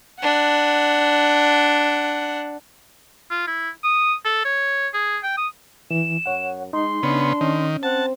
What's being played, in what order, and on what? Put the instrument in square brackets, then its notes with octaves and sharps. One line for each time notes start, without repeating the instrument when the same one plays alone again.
[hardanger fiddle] D4 F#5
[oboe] F4
E4
D#6
A4
C#5
G#4
G5
D#6
[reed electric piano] E3 [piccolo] E7
[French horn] F#2 [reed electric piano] C#5 F#5
[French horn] G#3 [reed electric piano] D#4 [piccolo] C6
[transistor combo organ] C#3 B3 [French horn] D4
[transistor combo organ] D#3 [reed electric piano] C#4
[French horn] C4 [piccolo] F#5 [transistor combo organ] A5